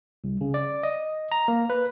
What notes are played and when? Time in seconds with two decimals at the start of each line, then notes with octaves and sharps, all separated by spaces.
0.24 C2
0.41 C#3
0.54 D5
0.83 D#5
1.32 A#5
1.48 A#3
1.70 B4